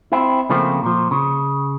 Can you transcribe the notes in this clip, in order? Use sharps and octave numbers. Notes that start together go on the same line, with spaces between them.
C4 E4
C#3 F3 A3 A#3 C4
A#2 F3
C#3